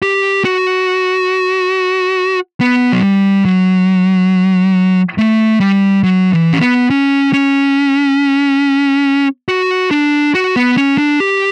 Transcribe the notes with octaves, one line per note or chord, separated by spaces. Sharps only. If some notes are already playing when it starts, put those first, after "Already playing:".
G4
F#4
B3
F#3
G3
F#3
A3
G3
F#3
E3
C#4
B3
C#4
C#4
F#4
D4
F#4
B3
C#4
D4
G4